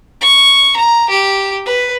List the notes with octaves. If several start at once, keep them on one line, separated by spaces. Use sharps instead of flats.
C#6
A#5
G4
B4